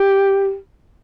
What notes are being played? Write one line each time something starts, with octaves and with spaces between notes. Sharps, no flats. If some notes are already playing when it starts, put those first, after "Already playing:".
Already playing: G4